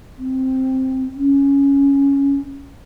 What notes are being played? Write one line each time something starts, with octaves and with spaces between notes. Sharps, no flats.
C4
C#4